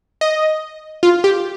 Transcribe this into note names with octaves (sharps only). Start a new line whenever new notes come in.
D#5
F4
G4